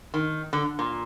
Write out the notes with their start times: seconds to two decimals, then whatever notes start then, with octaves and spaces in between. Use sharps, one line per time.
0.14 D#3
0.53 D3
0.79 A#2